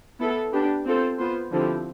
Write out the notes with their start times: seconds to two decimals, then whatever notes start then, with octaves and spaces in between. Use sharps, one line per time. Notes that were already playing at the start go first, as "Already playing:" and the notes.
0.19 B3 E4 A4
0.52 B3 D4 G4
0.85 C4 F4 A4 C5
1.18 B3 F4 C5
1.51 D3 F3 C4 E4 G4